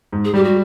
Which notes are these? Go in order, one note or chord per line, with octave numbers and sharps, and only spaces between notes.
G#2
G#4
G3 G4
F#4